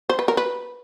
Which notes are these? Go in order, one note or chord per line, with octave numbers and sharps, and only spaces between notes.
C5
B4
A#4
B4